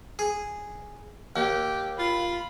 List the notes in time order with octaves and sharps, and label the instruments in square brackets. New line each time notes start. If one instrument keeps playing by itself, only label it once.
[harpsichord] G#4
[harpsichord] D#2 [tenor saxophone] G4
[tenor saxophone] F4 [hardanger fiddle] B5